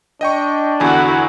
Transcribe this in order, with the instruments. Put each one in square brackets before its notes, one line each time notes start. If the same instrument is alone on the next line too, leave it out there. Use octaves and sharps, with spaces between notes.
[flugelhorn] D4 [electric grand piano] D#5 G5 C#6
[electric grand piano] E2 D3 G#5 [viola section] E4 F#4 A4